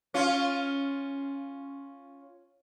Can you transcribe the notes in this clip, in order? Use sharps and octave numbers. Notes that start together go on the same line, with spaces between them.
C#4 F4